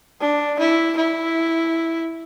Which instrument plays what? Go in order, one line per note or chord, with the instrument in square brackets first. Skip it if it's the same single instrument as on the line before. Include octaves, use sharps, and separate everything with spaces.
[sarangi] D4
E4
E4